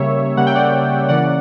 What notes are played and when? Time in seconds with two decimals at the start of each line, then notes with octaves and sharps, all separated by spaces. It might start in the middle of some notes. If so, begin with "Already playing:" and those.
Already playing: C#3 G3 A#3 C#5 E5
0.37 C#3 G3 A#3 F#5
0.47 G5
0.55 D5 F#5
1.09 C#3 E3 A#3 C#4 D5 F#5